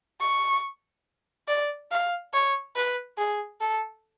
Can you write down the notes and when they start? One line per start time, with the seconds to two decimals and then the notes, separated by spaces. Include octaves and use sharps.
0.21 C#6
1.48 D5
1.91 F5
2.33 C#5
2.76 B4
3.18 G#4
3.61 A4